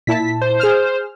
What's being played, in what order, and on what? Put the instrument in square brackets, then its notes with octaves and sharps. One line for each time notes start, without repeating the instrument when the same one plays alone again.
[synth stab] A#2 E4 A5 [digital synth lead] B6
[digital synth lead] C5
[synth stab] G#4 F6